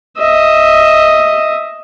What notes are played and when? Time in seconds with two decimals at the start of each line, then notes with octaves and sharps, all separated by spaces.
0.18 D#5 E5